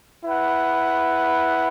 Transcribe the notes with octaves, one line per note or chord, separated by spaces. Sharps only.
E4 B4 F#5